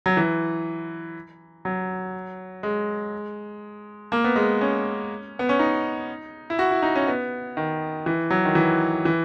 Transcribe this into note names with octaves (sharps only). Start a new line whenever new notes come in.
F#3
E3
F#3
G#3
A#3
B3
G#3
C#4
B3
C#4
D#4
E4
F#4
E4
D#4
C#4
B3
D#3
E3
F#3
D#3
E3
E3